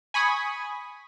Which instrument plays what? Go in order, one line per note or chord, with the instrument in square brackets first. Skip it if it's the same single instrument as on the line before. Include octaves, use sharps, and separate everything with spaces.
[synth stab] G#5 B5 C#6 D#6